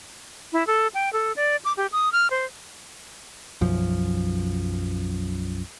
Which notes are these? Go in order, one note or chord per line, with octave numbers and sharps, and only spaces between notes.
E4
A4
G5
A4
D5
D6
G4
D#6
F6
C5
B1 F#2 F3